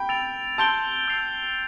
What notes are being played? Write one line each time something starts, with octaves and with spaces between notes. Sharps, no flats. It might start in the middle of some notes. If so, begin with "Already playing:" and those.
Already playing: G5 B5
E6 A6 D7 F7
A5 C6 E6 G6 D7 G7
E6 A6 C7 F7